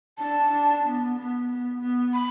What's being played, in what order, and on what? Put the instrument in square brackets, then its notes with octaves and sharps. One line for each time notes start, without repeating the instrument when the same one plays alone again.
[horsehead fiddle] D4 [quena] A5
[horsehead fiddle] D4
B3
B3
B3
B3
[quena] B5